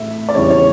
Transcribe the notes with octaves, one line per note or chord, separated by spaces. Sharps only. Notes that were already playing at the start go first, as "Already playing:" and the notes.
Already playing: A2 E5
D5
E2 C#3 G3 C#5
C#5